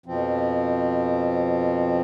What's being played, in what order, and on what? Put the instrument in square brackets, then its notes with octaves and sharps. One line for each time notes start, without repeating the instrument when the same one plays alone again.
[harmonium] F2 B2 F3 C4